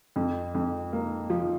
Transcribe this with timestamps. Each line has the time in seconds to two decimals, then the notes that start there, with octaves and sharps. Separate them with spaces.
0.16 F2
0.55 F2
0.93 A#3
1.30 F3